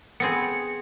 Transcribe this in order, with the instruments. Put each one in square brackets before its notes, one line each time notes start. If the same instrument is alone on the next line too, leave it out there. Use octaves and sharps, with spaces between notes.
[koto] B3 C4 G#4 [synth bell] C#7